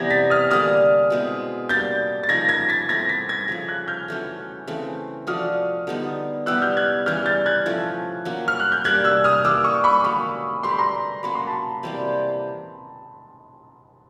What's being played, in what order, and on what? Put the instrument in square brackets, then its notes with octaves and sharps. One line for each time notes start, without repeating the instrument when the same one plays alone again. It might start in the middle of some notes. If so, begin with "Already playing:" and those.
Already playing: [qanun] C3 E3 G3 B3 [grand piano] G#6 A#6
[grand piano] A6 B6
D#6 F6
[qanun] D3 G3 A#3 D4 [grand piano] D#6 F6
[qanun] B2 G#3 C4 E4
[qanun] A#3 D4 G4 [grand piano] G6 A6
[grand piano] A6
[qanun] C#3 F3 A#3 D#4 [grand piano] G#6 A#6
[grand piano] G#6 A#6
A6 B6
[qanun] A3 C4 E4 [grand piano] G#6 A#6
[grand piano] A6 B6
G#6 A#6
[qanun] C#3 F3 A3
[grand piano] F#6 G#6
F6 G6
[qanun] E3 A3 C#4 F#4
C#3 E3 A3 C4
[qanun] F3 A3 D4 F#4 [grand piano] D#6 F6
[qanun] D3 G3 B3 D#4
[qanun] G3 B3 E4 G4 [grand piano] E6 F#6
[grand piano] F6 G6
F#6 G#6
[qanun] C#3 E3 G3 [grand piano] F6 G6
[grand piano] G6 A6
F#6 G#6
[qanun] F3 A3 C#4 E4
F#3 A#3 C#4 F#4
[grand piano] F6
F#6
G6
[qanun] G3 A#3 D4 G4 [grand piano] F#6 G#6
[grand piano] E6 F#6
D#6 F6
[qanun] E3 G3 A#3 [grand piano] D6 E6
[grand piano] C#6 D#6
B5 C#6
[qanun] D3 F#3 A#3 [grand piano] B5 C#6
[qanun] A3 D4 G4 B4 [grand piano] C6
[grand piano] B5
A#5 C6
[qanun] F#3 A#3 C#4 F#4 [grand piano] B5
[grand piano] C6
A5 B5
[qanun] C3 E3 G3 A#3